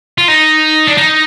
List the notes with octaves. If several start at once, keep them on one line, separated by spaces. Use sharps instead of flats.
F4
D#4
D4
D#4